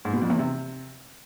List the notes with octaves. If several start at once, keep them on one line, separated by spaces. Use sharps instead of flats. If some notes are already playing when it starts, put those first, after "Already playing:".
G#2
B2
F2
E2
C3